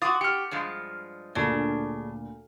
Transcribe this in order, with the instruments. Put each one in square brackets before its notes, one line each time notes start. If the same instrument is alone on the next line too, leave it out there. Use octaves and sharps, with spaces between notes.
[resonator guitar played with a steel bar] F4 F#4 [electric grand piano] D6 D#6 A6
[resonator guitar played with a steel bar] G4 [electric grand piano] F6 C#7
[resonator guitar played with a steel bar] G2 F3 G#3
[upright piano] D2 A#2 [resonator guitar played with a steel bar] C#3 D4